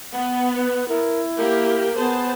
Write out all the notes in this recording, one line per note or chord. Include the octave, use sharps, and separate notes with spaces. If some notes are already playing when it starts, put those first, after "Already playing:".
B3 F#5
B4
E4 A#4
A#3 G4 A#4
B3 G#4 C5 A5